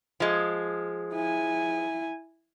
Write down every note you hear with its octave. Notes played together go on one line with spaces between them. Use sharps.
F3 G#3
E4 G#5